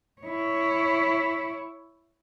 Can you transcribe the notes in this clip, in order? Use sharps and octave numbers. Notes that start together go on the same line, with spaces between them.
E4 C#5